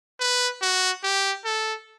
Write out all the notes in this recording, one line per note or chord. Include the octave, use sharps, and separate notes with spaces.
B4
F#4
G4
A4